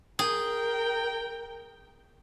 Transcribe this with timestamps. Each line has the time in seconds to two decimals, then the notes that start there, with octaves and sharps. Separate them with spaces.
0.19 G#4 A#4 G5